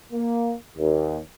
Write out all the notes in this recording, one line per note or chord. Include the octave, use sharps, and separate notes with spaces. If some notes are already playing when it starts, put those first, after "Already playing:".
A#3
D#2